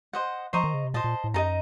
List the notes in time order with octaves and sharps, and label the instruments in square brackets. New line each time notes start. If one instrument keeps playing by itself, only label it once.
[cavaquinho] C5 D#5 F#5
[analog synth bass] F3 [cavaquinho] C5 D#5 A#5 C#6
[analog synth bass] D#3
C#3
C3
[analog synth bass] A#2 [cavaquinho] C5 D#5 A5
[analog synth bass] A#2
A2
[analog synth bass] F#2 [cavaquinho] D#4 A4 D#5 A#5